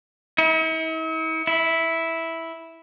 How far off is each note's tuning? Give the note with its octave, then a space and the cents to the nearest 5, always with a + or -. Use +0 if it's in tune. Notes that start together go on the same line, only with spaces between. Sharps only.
E4 -45
E4 -5